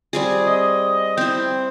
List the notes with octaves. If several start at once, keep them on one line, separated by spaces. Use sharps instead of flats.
G3 C4 G#4
D#5
C4 E4 G5